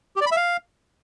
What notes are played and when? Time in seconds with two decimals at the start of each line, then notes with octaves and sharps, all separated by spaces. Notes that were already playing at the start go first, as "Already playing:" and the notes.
0.16 G4
0.21 D5
0.26 B5
0.32 E5
0.37 F5